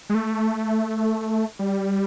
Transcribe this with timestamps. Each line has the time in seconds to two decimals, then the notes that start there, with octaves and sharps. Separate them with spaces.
0.10 G#3
0.15 A3
1.59 G3